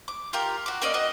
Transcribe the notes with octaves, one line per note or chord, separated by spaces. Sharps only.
D6
F4 G4 A#4 F5
F#4 D6
A#3 C#4 D5 D#5
F#4 D#5